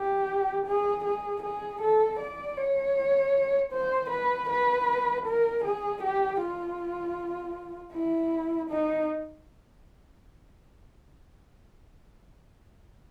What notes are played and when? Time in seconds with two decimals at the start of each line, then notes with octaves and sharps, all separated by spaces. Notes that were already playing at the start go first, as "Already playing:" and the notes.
Already playing: G4
0.66 G#4
1.04 G#4
1.42 G#4
1.81 A4
2.20 D5
2.57 C#5
3.73 C5
4.10 B4
4.49 B4
5.26 A#4
5.64 G#4
6.03 G4
6.41 F4
7.93 E4
8.70 D#4